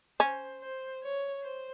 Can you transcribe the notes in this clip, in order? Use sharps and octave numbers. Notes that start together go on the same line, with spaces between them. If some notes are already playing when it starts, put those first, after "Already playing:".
C#4 C5
C5
C#5
C5